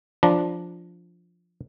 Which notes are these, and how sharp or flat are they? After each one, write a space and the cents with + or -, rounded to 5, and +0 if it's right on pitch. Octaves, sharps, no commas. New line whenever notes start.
F3 +0 D4 +0 A#5 +15